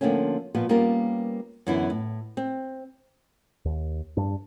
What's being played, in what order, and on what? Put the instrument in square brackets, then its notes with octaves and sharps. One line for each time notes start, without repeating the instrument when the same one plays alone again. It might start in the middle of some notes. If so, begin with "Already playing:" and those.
[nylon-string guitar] D3 F3 A3 A#3 C4 C#4
A#2 F3 B3 B4
G3 A#3 B3 C#4 F4 A#4
F#2 D3 E3 B3 E4
A2
C4
[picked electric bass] D#2
G2 D4